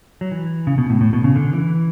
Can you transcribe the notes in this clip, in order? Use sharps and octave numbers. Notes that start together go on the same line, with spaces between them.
F#3
E3
C#3
B2
A2
A2
B2
C#3
D3
E3